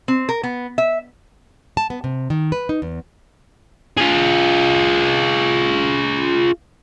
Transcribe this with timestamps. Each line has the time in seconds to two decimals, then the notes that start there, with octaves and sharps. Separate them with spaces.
0.08 C4
0.29 A#4
0.43 B3
0.78 E5
1.77 A5
1.90 B3
2.04 C3
2.30 D#3
2.52 B4
2.69 D#4
2.82 E2
3.97 F4 G#4